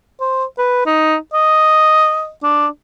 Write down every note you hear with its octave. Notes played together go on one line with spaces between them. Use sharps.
C5
B4
D#4
D#5
D4